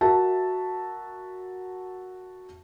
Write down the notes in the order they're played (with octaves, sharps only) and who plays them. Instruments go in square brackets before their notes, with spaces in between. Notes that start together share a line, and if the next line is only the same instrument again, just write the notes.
[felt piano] F#4 A#4 E5 A5